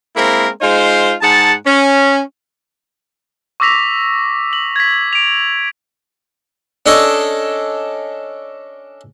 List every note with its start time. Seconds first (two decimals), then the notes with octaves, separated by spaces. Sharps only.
0.16 G#3 A#3 C4 E4 A#4
0.62 G#3 D#4 F4 C5
1.22 G#2 G#4 F#5 A5
1.67 C#4
3.60 C#6 D6 E6 A#6 B6 F7
4.53 F#7
4.76 G#6 B6
5.13 D7 F7
6.86 C#4 D4 A4 C#5 D#5